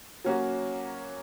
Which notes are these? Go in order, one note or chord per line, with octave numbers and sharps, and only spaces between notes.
F#3 A#3 C#4 F#4